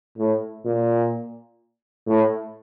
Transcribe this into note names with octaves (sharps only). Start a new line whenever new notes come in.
A2
A#2
A2